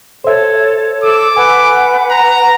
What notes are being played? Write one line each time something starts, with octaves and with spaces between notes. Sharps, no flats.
A4 C5 C#5 E5
A4 D6 E6
B4 F#5 G#5
A#5